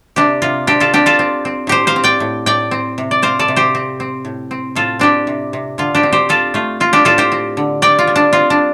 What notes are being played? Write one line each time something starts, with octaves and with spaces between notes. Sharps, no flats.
C3 D4 G4
C3 F4
C4 D4 G4
F4 A4
C4 D4 G4
F4 A4
C4
C4
A2 G4 C5
C5 F5
C4
D5 G5
A2
A2 D5 G5
C4
C3
D5
C4 C5 F5
A4 D5
C3
G4 C5
C4
C4
A2
C4
A2 F4 A4
C4 D4 G4
C3
C3
D3 F4
D4 G4
C4
G4 C5
C4 F4 A4
A3 F4
C4 F4
D4 G4
A2 F4 A4
G4 C5
C4
D3
G3 D5 G5
F4
G3
D4
C4 F4
D4